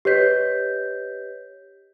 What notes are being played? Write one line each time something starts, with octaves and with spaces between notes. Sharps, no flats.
G4 B4 C#5 D#5 G6 B6